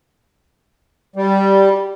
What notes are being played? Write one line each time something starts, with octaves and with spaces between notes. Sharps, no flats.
G3